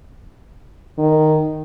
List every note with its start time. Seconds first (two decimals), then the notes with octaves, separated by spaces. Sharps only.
0.98 D#3